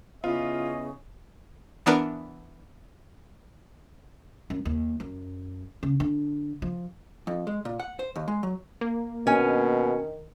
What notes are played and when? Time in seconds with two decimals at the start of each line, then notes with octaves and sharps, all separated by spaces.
0.24 C#3 B3 E4 F4 D#5
1.86 E3 B3 D4 A#4 B4
4.50 F#2
4.65 D#2
5.00 F#2
5.83 C#3
6.00 D3
6.62 F3
7.27 F2
7.47 G#3
7.65 A#2
7.80 F#5
7.99 C5
8.16 D#2
8.28 G#3
8.43 F#3
8.81 A#3
9.27 B2 D#3 C#4 G#5